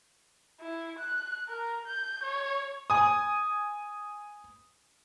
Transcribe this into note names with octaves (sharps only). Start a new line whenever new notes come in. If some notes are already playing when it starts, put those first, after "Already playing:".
E4
F#6
A#4
G6
C#5
G#5 D#6